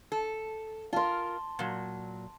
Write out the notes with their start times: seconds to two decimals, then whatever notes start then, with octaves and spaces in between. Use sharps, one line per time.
0.12 A4
0.93 F4 A#4 A5 C6
1.59 A#2 F#3